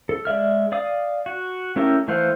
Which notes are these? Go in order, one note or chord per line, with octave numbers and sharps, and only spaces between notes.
A4
G#3 D5 E5 F6
D5 F5 D#6
F#4
A3 C#4 E4 G4 A#4
E3 A3 C5 F5 F#5